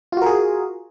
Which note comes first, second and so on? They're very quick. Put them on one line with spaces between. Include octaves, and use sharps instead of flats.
F4 F#4 A#4 G#4